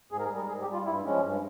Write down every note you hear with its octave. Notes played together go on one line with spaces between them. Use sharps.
G#2 G#4
A#4
G#4
G3
A#4
G#2 G#4
G4
G3
F4
G2 E4
F3 G#3 C#4
G2